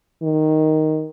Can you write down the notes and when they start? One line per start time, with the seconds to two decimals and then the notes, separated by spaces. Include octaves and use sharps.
0.22 D#3